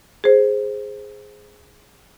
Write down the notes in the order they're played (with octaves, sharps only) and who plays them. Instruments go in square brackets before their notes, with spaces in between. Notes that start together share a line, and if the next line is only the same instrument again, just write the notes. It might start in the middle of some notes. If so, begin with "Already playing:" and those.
[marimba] G#4 C5